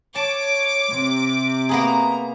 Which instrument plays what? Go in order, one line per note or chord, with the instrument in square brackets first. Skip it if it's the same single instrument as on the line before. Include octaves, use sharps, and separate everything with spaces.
[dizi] C#5 [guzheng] A5 [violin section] D6
[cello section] C3
[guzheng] A#3 B3 G#4 [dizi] A#5